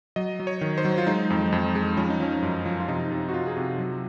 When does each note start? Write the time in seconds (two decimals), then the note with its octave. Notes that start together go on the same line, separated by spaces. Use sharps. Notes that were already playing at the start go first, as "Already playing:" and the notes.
0.16 F#3 D#5
0.40 F#3
0.47 C#5
0.61 D#3
0.78 C5
0.85 F#3
0.98 F4
1.07 G#3 D#4
1.30 F2
1.52 F2
1.75 G#3
1.97 F3 C#4
2.10 D#4
2.20 F3 C#4
2.42 F#2
2.65 F3
2.80 F4
2.88 C3 D#4
3.11 C3
3.29 F#4
3.33 C3 F4
3.47 G#4
3.56 C3 F#4
3.78 F#3